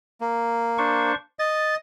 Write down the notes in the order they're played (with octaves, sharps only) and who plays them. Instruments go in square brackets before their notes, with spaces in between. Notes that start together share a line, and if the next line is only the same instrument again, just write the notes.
[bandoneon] A#3
[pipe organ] D4 C5 C#6
[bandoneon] D#5 [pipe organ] A6